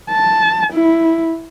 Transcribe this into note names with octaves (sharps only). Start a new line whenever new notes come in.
A5
E4